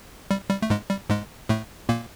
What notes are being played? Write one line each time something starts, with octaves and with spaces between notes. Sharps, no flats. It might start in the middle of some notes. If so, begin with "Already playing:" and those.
G3
G3
A3
G#2 G#3
G3
G#2 G#3
A2 A3
A#2 A#3